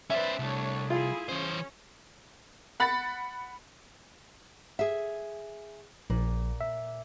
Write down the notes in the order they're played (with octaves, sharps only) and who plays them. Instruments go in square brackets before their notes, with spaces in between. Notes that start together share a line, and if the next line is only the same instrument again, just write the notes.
[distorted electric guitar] C#4 C5 [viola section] B4 D5 [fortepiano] E5
[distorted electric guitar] C2 [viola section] A3 D4 C#5
[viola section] E4 G#4 [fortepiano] F4
[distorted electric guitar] E3 C5 [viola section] C#4
[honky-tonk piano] F#5 B5 A6
[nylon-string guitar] G#4 E5
[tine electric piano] A#1 [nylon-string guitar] A#2
[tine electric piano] E5